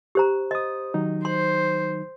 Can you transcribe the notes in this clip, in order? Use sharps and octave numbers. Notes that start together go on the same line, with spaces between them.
G4 C5 A#5
C5 D#5 D#6
D#3 F#3 D#4
C5 C6